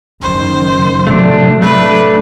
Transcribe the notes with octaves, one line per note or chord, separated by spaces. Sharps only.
F#1 D#3 C5
A2 C3 F#3 A3 D4
A3 D4 B4